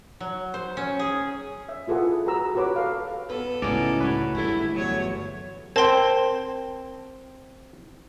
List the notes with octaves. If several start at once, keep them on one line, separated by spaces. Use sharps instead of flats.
F#3
C5
C#4
G#4
E5
E4 F4 G#4 A4 B4 F#5
F#4 G#4 B4 A#5 E6
F#4 G4 B4 C#5 D6
A4 F5
B3 A4 B4
C#2 A2 G#3 B3 C#4 D#4 F#4 D5
G#3 F#4 B4 C#5
G1 A3 E4
E2 F#3 C#5
C4 A#4 G5 A5 C6